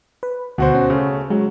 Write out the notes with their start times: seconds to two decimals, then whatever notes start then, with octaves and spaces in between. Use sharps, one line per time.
0.23 B4
0.58 D2 B2 F#4 C5
0.75 C#4
0.90 C#3 A3
1.30 F#3 G#3